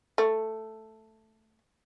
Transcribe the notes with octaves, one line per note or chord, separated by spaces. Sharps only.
A3